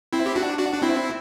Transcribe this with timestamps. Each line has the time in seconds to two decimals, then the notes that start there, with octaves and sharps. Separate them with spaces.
0.13 C4 E4
0.26 G4
0.35 D4 F#4
0.59 D4 F#4
0.73 D4
0.82 C4 E4